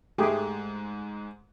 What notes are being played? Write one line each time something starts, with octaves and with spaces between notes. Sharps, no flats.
G#2 G#3 A3 G4 G#4